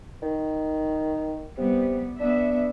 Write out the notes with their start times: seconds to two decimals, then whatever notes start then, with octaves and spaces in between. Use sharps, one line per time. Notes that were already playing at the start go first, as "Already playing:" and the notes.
0.22 D#3
1.57 C3 G3 B3
2.20 B3 D4 E5